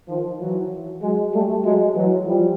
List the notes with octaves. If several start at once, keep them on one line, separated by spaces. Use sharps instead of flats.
D#3 F3
E3 F#3
F#3 G#3
G3 A3
F#3 G#3
E3 F#3
F3 G3